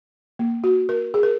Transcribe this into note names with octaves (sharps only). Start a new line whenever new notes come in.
A#3
F#4
A#4
G#4
A#4